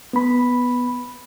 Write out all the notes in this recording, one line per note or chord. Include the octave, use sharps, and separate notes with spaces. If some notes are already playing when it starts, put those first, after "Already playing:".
B3 B5